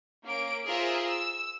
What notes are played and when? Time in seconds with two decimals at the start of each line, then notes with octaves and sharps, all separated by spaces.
0.24 A#3 C#4 D7
0.67 F4 G#4 A#4 C5 E5
1.06 E6